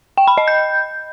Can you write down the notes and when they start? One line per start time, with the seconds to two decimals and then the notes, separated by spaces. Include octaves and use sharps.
0.17 G5
0.27 B5
0.38 D#5
0.48 G6